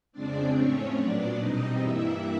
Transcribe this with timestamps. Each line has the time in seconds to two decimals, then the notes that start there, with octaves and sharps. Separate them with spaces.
0.12 F2 C#3 F3 G#3 C4 D4 D5
0.54 A2 F3 A3 C4 C#4 C#5
0.96 A#2 F#3 B3 D4 D5
1.37 E2 B2 G3 C4 D#4 D#5
1.79 G2 E3 G3 A#3 E4 E5